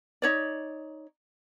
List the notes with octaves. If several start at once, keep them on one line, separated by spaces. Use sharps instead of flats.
D#4 C#5 D5